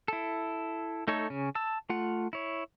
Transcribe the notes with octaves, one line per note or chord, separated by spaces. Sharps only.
E4 A4
A3 D#4 A4 C#5
C#3 C#4
A5 E6
A3 F4 F#5
E4 C#5